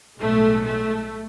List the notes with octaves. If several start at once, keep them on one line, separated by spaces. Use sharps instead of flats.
B1 A2 G#3 A3
A3